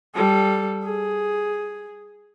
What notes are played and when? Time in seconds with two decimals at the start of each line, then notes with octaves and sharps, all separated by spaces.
0.15 G3 A4
0.84 G#4